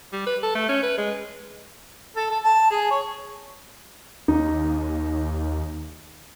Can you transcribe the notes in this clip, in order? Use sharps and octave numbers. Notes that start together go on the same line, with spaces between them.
G3
B4
A4
A3
C#4
B4
G#3
A4
A4
A5
G#4
C#5
D#2 D#4